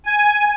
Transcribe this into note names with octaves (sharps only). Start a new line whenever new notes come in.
G#5